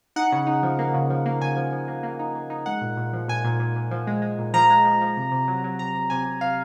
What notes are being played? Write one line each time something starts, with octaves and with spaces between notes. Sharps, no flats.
D#4 F#5
C#3
D#4
F3
A#3
C#3
F3
A#3
C#3 G#5
F3
F3
A#3
A#3
D#4
A#3
D#4
G#3 F#5
A#2
A#2
F3
A#2 G#5
A#2
A#2
A#2
F3
G#3
G#3
A#2
F3 A#5
G#3
F3
F3
C3
C3
F#3
F#3
C3 A#5
C3
C3 G#5
C3
C3 F5